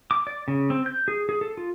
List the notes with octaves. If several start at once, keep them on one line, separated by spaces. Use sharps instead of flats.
D6
D5
C#3
C4
G6
G#4
G#4
A4
F4